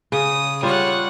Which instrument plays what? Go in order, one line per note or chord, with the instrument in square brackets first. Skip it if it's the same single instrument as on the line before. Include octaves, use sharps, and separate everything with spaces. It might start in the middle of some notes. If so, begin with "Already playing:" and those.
[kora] C#3 [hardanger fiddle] D#6
[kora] G3 F4 [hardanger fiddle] C#5 F#5